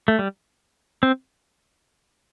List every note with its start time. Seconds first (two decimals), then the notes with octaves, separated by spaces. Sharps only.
0.08 A3
0.19 G3
1.03 C4